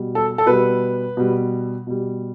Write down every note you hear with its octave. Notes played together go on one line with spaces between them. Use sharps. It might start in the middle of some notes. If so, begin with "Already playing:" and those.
Already playing: B2 G3
A4
A4
B2 G3 B4
B2 G3
B2 G3